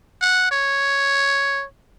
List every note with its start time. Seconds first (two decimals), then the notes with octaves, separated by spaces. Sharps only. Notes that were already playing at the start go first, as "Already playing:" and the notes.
0.21 F#5
0.51 C#5